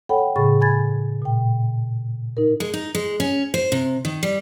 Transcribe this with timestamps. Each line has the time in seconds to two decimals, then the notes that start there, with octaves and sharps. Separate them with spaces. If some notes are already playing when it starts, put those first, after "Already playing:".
0.09 A4 C#5 F#5 G5 B5
0.36 A2 C#3 G#4 B5 C#6 A6
0.61 G#5 B5 G#6 A6
1.22 A#2 G5
2.37 D#4 A#4
2.60 G#3
2.74 D#4
2.95 G#3
3.20 C#4
3.54 C5
3.72 C3
4.05 D#3
4.23 G3